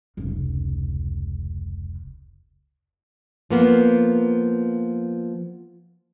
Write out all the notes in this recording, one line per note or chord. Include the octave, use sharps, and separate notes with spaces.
F1 C#2
F3 A#3 B3